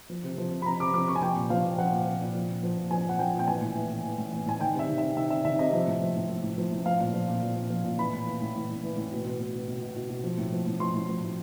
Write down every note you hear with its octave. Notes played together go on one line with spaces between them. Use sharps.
F3
C3
F3
C3
B5
F3 A#5
C3 D6
F3 D6
C3 C#6
G#5
F3 G5
A#2
F3 F5
A#2
F3 F#5
A#2
F3
A#2
F3
A#2
F3
A#2
F3 G#5
A#2 F#5
F3 G5
A#2
G5
E3 G#5
A2
E3
A2
E3
A2
E3
A2 G#5
D#3 G5
C3 E5
D#3
E5
C3
D#3 E5
C3 E5
D#3 E5
C3 D#5
F3 E5
A2
F3
A2
F3
A2
F3
A2
F3 F5
A#2
F3
A#2
F3
A#2
F3
A#2
E3 B5
A2
E3
A2
E3
A2
E3
A2
B2
B2
B2
B2
B2
B2
B2
B2
F3
A2
F3
A2
F3 C6
A2
F3
A2